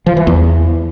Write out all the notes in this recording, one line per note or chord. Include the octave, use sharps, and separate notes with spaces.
F3
E3
E2